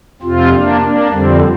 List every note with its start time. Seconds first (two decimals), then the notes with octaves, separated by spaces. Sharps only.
0.22 F2 C3 C4 F4
0.51 A#3 D4
0.81 A#3 D4
1.10 F2 D3 G3 C4